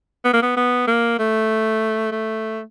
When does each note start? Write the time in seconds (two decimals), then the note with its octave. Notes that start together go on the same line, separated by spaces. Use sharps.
0.25 B3
0.33 A#3
0.42 B3
0.57 B3
0.87 A#3
1.19 A3
2.12 A3